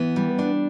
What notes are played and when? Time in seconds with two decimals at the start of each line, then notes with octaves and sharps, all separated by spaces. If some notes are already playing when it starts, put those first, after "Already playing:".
Already playing: E3 B3
0.16 G3
0.39 D4